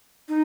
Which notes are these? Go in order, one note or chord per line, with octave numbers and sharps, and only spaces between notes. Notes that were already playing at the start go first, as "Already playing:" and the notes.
D#4